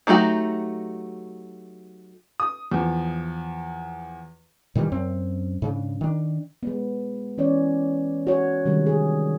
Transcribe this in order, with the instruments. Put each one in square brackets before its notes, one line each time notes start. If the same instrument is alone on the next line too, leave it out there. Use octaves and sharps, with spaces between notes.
[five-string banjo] F#3 A3 D#4 F#4 G4
[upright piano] D#6
E2 F3
[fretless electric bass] A#2 D#3 E3 G3
F#2 C4
G#2 C#3 D4
D#3 D4
[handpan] G#3 B3
E3 C#4 C#5 D5
F#4 C#5
C3 D#3 G3 G#3
G#4